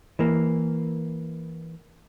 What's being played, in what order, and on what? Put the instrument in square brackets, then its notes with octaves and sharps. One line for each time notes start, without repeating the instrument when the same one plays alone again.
[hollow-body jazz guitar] E3 A#3